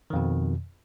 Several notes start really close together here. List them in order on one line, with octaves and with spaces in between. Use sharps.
D#3 F2 B2